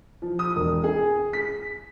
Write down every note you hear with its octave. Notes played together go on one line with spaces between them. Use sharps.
F3
D#6
E1
G#4
B6